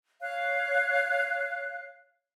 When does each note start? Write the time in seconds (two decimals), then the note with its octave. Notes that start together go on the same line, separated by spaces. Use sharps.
0.20 C#5 F5 F#6